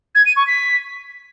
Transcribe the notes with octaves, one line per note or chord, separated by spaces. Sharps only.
G#6
D#7
C#6
B6